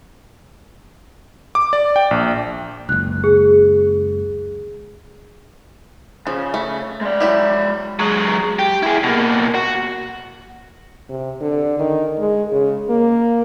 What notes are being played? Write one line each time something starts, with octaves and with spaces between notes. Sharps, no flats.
D6
D5
G5
A#1
F#1 C#2 F#6
G#4
C#3 F3
A3
G#3 D5
F#3 E4 G4
F#3 G#3
G4
E4 G#4
B2 A#3
F#4
C3
D3
D#3
G#3
C#3
A#3